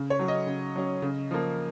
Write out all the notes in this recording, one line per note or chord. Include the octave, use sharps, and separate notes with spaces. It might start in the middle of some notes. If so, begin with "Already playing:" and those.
Already playing: C#3
C#5
F#3 C#4
D#5
C#3
F#3 C#4
C#3
F3 A#3